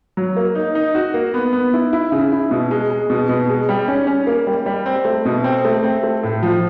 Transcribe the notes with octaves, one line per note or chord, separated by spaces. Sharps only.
F#3
A#3
D#4
D#4
F#4
A#3
B3
B3
E4
E4
C#3
E4
B2
G#3
G#3
B2
B2
G#3
G3
C#4
C#4
A#3
G3
G3
C4
A3
B2
C4
A3
C4
A3
A2
F3